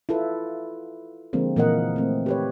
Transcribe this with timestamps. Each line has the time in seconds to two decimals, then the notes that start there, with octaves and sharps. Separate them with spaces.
0.09 E4 F4 A4 B4
1.33 D3 F3 G#3 A#3 C4
1.56 A#2 E3 A#3 A#4 D#5 F#5
1.96 A3 C4
2.26 G4 B4 C#5